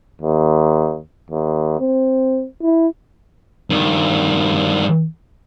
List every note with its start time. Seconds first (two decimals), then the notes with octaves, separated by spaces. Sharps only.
0.22 D#2
1.30 D#2
1.80 C4
2.62 E4
3.70 G2 D#3